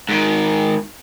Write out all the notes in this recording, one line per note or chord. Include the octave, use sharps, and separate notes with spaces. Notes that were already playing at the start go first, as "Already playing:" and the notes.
G#2 D#3